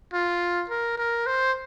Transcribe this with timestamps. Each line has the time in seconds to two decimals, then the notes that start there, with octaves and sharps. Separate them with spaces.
0.13 F4
0.70 A#4
0.98 A#4
1.27 C5